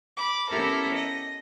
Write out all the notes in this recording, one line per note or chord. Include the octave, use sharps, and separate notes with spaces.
B5 D6
B3 C#4 E4 G4 A4 A#4
D#5